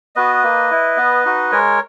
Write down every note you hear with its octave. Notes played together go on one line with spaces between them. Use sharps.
B3 F#4 B4 D#5
A#3
E4
B3
D#4 F#4
G#3 A#4 C#5